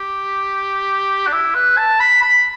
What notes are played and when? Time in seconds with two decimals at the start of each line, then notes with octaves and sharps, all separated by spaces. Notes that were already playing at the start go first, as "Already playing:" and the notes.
Already playing: G4
1.27 D4
1.33 E4
1.55 B4
1.78 A5
2.00 B5
2.22 B5